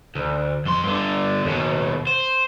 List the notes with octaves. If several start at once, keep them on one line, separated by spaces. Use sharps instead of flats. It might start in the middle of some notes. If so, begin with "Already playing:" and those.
D2
F2 C6
G2 D3
D#2 B2
C5